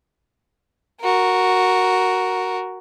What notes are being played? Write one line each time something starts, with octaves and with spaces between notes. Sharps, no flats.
F#4 A#4